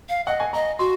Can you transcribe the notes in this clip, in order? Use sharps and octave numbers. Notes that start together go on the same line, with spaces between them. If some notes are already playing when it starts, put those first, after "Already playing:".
F5
D#5 F#5
G#5
D#5 A#5
F#4 C6